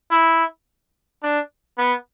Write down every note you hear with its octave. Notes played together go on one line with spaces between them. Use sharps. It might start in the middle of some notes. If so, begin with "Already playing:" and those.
E4
D4
B3